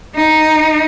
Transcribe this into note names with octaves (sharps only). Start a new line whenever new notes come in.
D#4